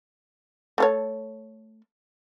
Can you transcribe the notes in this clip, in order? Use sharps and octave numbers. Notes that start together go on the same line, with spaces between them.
A3 A4 C#5